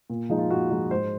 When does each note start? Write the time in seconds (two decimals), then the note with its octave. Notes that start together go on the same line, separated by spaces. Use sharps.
0.10 A#2
0.29 F3 G#3 D#4
0.38 F4
0.50 A#2 F#4
0.71 F3 G#3 D#4
0.91 G#2 C5